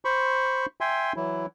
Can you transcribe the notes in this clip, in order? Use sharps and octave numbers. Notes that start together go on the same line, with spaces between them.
C5 B5 C#6
E5 G5 G#5 C6
E3 F#3 E4